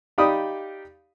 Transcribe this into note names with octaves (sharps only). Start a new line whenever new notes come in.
D#4 G4 D5 F5 B5 D#6